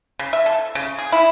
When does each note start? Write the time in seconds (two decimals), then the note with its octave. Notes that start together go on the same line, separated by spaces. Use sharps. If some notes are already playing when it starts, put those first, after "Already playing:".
0.19 C#3
0.33 E5
0.46 A4
0.75 C#3
0.98 G#4
1.12 E4